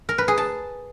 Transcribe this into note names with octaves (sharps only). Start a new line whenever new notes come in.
A#4
B4
G#4
A5